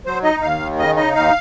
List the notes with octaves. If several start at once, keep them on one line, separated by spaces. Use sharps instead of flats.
F#3 C5
D#4 D#5
D#2 F5
D#3
C#3 D#5
D#4 D#5
D#2 F5